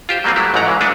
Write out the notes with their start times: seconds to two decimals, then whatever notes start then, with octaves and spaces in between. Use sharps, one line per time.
0.09 F4 G4 C5
0.24 F#3 G3 A#3 C4 G#4
0.36 F#3 G#3 A3 E4 G4
0.54 A1 G#2 F3 F#3 F#5 A#5
0.67 C#3 E3 F#3 G#3
0.80 G#3 A3 D4 F#4 B4